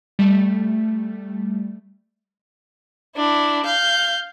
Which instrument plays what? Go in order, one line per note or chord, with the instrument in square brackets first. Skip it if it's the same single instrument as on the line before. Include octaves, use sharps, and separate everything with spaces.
[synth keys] G3 A3
[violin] D4 E4
F5 G6